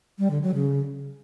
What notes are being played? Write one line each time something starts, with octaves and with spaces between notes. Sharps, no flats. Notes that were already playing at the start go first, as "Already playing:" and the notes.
G3
D3
F#3
C#3